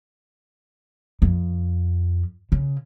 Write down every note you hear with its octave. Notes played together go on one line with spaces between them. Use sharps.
F2
C#3